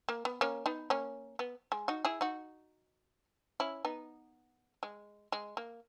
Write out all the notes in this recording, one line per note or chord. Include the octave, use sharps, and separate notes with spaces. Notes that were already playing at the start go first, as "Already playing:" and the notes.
A#3
B3
A#3 C#4
B3 D#4
A#3 C#4
B3
G#3
D#4 F#4
E4 G#4
D#4 F#4
C#4 E4
B3 D#4
G#3
G#3
A#3